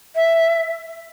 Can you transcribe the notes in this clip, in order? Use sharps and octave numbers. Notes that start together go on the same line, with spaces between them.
E5